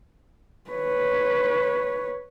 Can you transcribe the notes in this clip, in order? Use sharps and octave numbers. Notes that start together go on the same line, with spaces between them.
B4 C#5